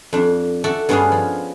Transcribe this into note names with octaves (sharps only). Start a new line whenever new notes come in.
F2 D4
F#4 A4 D5 E5
G2 B3 C#4 D4 G#4 F5
F3